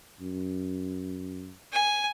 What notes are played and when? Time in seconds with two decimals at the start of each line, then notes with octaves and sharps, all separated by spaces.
0.20 F#2
1.73 G#5